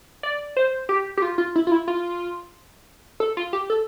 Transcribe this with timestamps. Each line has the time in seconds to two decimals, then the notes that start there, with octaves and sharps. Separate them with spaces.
0.23 D5
0.57 C5
0.89 G4
1.17 G4
1.22 F4
1.38 F4
1.56 E4
1.67 F4
1.72 E4
1.88 F4
3.20 A4
3.37 F4
3.53 G4
3.70 A4